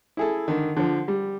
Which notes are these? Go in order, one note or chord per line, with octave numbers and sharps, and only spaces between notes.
E4 G#4 A4
D3 D#3
D3 F3
G3